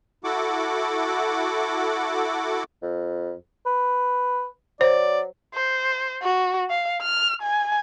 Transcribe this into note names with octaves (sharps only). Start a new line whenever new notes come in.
E4 F#4 A4 F#5 D6
F2
B4
F#3 C5 D5
C5
F#4
F5
F6
G#5